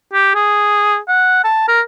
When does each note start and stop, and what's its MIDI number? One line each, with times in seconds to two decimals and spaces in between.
0.13 0.34 67
0.35 0.98 68
1.08 1.40 78
1.44 1.67 81
1.68 1.81 70